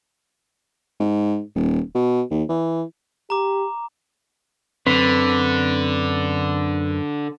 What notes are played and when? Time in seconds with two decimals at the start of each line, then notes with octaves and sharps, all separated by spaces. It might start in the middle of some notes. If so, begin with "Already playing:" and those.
1.00 G#2
1.55 D#1
1.95 B2
2.31 D#2
2.49 E3
3.30 G4 A#5 D6
4.87 F#2 D3 C4 B4